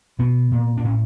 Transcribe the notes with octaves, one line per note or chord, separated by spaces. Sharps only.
B2 B3
A#2
D4
A2 C#4